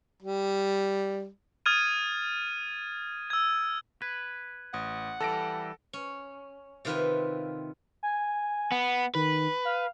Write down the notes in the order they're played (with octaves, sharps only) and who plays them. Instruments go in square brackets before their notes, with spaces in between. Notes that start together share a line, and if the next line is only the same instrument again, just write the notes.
[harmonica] G3
[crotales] D#6 F6 G#6 A6 D#7
E6 G#6
[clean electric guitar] B4 [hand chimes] G#6
[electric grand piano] A1 [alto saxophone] F#5 [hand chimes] D#6
[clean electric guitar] E3 G3 [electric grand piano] A4 A#6 D7 [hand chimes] A5
[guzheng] C#4
C3 D#3 F4 B4 E5
[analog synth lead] G#5
[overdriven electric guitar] B3
[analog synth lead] D#3 [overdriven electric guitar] B4
[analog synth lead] F5